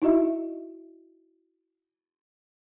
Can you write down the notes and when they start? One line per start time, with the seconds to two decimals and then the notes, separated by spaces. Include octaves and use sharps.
0.02 D#4 E4 F#4 D#5 E5